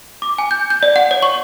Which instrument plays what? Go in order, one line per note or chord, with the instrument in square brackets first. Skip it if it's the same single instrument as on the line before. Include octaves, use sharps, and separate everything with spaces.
[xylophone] D6
G#5
G6
G6
D5
F#5
C#5
C#6